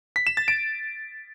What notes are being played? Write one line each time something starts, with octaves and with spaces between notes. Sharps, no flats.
B6
E7
A6
D7